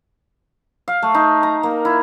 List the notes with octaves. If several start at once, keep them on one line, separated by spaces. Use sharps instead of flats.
F5
A3
D#4
A#5
A#3
E4